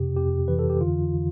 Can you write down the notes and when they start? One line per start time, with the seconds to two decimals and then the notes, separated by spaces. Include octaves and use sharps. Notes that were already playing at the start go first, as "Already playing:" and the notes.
Already playing: F2 C3 G4
0.16 F2 G4
0.48 E3 B4
0.59 A4
0.70 G4
0.81 D3 F4